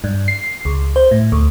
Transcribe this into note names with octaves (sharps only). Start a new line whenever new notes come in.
G2
C7
C#2
C5
A2
D2